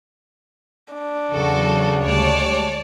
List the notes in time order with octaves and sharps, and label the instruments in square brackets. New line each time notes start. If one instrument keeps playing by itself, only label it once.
[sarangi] D4
[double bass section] E2 F#3 [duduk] C#3 [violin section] F#4 A4
[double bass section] D2 G3 G#3 [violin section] C#5 D5 A5